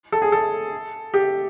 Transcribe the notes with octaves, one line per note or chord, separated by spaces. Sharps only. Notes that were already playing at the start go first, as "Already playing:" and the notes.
A4
G#4
A4
G4